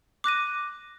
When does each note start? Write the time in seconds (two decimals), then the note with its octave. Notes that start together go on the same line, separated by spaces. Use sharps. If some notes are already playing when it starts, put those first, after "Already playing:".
0.24 D6 F#6 A#6 D#7